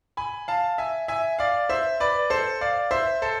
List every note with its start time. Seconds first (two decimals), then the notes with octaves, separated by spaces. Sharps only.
0.17 G#5 B5
0.48 F5 A5
0.78 E5 G#5
1.08 E5 G#5
1.39 D5 F5
1.69 C5 E5
2.00 B4 D5
2.30 A4 C5
2.61 D5 F5
2.91 C5 E5
3.22 A4 C5